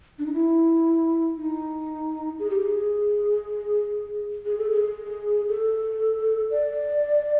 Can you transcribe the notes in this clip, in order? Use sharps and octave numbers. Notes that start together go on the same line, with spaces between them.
D4
D#4
E4
D#4
G#4
G4
G#4
G#4
A4
G#4
A4
D5